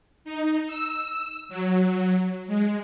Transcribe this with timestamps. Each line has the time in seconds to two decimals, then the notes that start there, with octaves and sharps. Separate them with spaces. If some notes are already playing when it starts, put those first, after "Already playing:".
0.25 D#4
0.67 E6
1.49 F#3
2.47 G#3